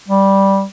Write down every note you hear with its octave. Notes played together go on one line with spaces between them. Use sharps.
G3